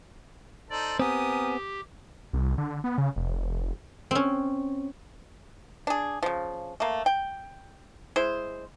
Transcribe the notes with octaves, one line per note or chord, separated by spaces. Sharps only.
D#4 A4 C5 D5
B3 C4 G4 A#4 G#5 D#6
C2
D3
B3
C#3
F1
C4 C#4
D4 G#4
C#3 F3
A3 A#3
G5
G#3 E4 C5